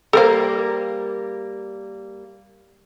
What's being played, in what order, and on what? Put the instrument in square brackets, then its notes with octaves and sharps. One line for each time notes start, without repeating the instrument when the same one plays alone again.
[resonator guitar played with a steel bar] G3 A#3 [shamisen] A4 A#4 C5